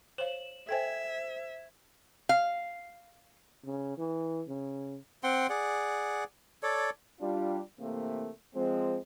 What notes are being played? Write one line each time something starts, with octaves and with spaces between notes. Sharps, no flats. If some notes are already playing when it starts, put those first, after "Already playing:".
C5 C#5 F5 E7 F#7
A4 C5 E5 G5 G#5 G#6
F5
C#3
E3
C#3
C4 F#5 G5 C6
G#4 D5 F#5
A4 C#5 D5
G3 D4 F4
C3 E3 A3 A#3
F3 G#3 C4